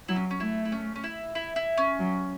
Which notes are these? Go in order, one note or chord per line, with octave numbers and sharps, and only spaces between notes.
F#3 E4
C#4
C#4
A3 E4
E4
C#4
C#4
E4
E4
E4
C#4
F#3